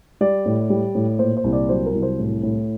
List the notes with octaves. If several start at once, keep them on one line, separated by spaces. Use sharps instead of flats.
G3 D5
A2
G3
A2
A#2 C5
C5
C2
D5
F#3 C5
A#4
C2
C5
A2
A2